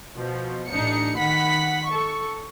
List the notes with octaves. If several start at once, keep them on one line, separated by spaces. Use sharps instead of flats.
B2 F3
A1 D4 D#4 C#7
D#3 F#5 B5 B6
A4 C#6